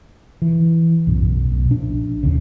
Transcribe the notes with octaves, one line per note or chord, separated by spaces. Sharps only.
E3
B1 F#2 A2
B1
A#1 D4
F1 D#2 C#3